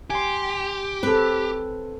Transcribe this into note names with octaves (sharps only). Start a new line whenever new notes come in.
G4 G#5 C6
C4 A4 B4